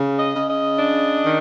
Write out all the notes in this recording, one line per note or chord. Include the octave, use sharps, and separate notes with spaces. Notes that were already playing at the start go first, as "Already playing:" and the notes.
Already playing: C#3
D#5
C#3
D#5
D4
D#3